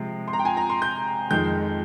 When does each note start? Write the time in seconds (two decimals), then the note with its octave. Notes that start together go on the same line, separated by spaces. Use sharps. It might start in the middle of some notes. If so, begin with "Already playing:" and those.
Already playing: C3 F3 G#3
0.28 C6
0.33 A#5
0.39 G5
0.45 G#5
0.57 A#5
0.69 C6
0.82 G6
1.31 F2 D#3 G#3 G6